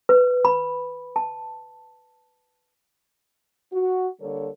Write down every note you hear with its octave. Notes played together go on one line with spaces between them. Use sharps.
B4
B5
A5
F#4
D3 G3 A#3 A4 A#4 C#5